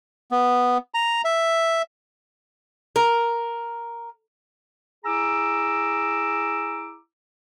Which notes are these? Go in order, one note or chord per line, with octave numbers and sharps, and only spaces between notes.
B3
A#5
E5
A#4
E4 G#4 A#5 D6 E6